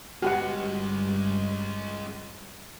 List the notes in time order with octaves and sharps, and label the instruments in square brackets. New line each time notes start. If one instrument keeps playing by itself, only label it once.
[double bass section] G1 G2 [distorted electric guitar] G#3 C#4 [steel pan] F#4 G4 F#5